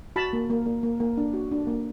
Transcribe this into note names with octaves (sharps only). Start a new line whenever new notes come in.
F#4 A5 B5
A#3
A#3
A#3
A#3
A#3
D4
F#4
D4
A#3